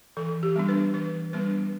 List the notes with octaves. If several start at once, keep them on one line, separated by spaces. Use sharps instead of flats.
E3 A4
G4
G3 B3 D4
B4
E3 B4
G3 B3 D4 B4